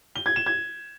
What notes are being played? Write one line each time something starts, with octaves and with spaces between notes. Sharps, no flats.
G7
G#6
E7
G#6